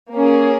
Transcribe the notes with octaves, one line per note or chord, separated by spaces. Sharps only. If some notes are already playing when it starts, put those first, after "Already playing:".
A#3 C#4 G#4